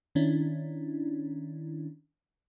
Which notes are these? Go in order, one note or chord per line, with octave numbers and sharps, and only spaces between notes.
D#3 C#4 D4 E4